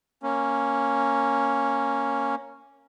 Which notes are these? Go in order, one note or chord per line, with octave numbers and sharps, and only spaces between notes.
A#3 C#4